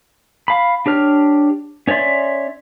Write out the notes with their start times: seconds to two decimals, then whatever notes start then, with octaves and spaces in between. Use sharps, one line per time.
0.48 F5 B5
0.86 D4 G4 C#5 F6
1.87 C#4 C#5 D5 E5 C6